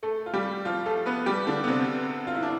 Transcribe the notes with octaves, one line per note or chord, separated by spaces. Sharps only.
A3 A4
F4
G3 G4
F3 F4
A3 A4
B3 B4
G3 G4
D3 D4
B3
C3 C4
F4
E4
D4